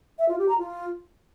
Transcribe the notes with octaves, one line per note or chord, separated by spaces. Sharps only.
E5
F4
G4
A#5
F4